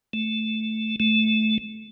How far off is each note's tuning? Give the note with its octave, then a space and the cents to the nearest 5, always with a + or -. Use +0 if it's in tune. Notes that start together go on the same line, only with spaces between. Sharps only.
A3 -5
A3 -15